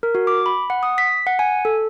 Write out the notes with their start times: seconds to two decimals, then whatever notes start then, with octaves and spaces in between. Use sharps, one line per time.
0.03 A#4
0.15 F#4
0.27 D6
0.46 B5
0.70 F#5
0.83 D#6
0.98 B6
1.27 F#5
1.39 G#5
1.65 A4